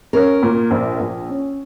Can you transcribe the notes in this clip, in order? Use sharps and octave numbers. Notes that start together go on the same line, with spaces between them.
C#4 A#4
A#2
A#1
A#1
C#4